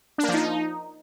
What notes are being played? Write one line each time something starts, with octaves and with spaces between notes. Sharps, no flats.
D4
A#3
F3
D#4